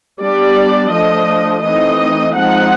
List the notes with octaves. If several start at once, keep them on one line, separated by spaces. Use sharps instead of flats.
G3 B3 D4 D5
F3 A3 D4 D#5
E3 A3 C4 D#4 D#5
F3 G#3 C4 D#4 F#5